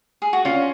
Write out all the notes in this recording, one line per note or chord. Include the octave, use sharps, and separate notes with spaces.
G#4
F#4
C#4 F4